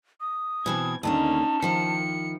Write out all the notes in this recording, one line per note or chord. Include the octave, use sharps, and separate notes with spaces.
D#6
B2 E3 C4 G#6
D#2 D3 A#3 C#4 D#4 A5
D#3 F3 E4 C#7